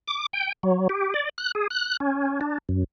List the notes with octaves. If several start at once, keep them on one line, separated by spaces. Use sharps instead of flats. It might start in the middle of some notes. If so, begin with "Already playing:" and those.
D6
G5
F#3
G4
D5
F#6
G#4
F#6
C#4
D4
F#2